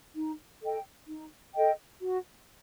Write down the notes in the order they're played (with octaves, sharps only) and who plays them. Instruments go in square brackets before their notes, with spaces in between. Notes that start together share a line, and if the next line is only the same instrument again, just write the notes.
[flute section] D#4
A4 D#5 G5
D#4
A4 D#5 G5
F#4